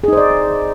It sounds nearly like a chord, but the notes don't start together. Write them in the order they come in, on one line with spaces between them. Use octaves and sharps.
G#4 D#4 C5 D5